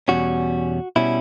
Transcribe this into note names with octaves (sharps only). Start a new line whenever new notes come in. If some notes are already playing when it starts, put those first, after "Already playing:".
E2 B2 G3 C#4 F#4
B2 G3 C#4 E4